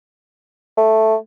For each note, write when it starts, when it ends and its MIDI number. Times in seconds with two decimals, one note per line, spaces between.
0.77 1.15 57